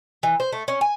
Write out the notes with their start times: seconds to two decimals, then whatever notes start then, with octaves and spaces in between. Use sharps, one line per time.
0.23 E3
0.40 C5
0.52 A3
0.68 C#4
0.81 G#5